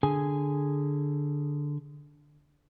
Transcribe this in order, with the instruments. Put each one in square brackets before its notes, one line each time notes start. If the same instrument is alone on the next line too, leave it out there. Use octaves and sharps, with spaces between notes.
[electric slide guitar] D3 G#4 G#5